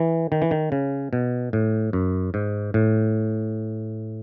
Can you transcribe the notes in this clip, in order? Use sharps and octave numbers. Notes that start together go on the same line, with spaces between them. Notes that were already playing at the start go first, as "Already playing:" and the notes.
Already playing: E3
D#3
E3
D#3
C#3
B2
A2
F#2
G#2
A2